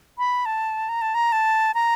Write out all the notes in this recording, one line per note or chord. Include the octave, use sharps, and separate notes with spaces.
B5
A5
A#5
A5
A#5
A5
A#5